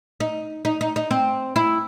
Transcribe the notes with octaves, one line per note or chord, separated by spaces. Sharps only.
D#4
D#4
D#4
D#4
C4
E4